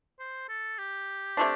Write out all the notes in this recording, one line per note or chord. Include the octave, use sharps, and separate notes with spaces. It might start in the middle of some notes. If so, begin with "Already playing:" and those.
C5
A4
G4
C3 A3 D4